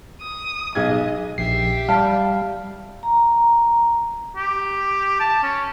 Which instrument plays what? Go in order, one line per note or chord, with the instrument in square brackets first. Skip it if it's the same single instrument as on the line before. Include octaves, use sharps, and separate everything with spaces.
[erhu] D#6
[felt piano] B1 G#4 G#6 [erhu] D#5
[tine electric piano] A#1 C7 [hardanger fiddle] G4 E5
[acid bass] G3 [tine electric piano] F5 [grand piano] A5
[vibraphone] A#5
[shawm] G4
A5
C#4